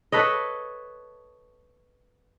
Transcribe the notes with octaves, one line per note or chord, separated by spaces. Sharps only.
A4 B4 C#5 D#5